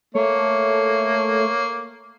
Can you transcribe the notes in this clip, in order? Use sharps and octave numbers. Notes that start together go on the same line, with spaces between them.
A3 A#3 C#5